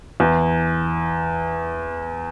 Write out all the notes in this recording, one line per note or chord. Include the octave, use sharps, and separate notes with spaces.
E2